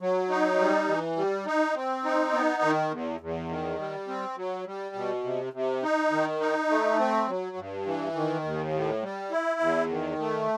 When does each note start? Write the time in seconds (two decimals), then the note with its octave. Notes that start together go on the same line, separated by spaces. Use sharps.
0.01 F#3
0.30 D#4
0.58 G3
0.88 E3
1.17 G3
1.46 D#4
1.75 C4
2.04 D#4
2.33 B3
2.63 D#3
2.91 E2
3.20 E2
3.49 D#3
3.79 G3
4.08 C4
4.37 F#3
4.66 G3
4.95 B2
5.24 C3
5.53 C3
5.83 D#4
6.11 D#3
6.40 D#4
6.70 A3
6.99 C4
7.28 F#3
7.57 G2
7.86 E3
8.15 D#3
8.44 D#2
8.74 A2
9.02 G3
9.31 E4
9.60 E2
9.90 D#3
10.19 A3